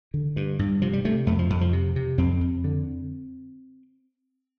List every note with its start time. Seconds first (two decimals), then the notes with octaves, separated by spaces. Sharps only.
0.14 D3
0.36 G2
0.59 G2
0.82 C3 F3
0.93 G3
1.05 C3 A3
1.27 F2 A3
1.39 F3
1.50 F2
1.61 F3
1.73 C3
1.96 C3
2.18 F2 C4
2.41 F2
2.64 D3